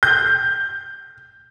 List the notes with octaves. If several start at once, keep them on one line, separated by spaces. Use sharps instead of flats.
G6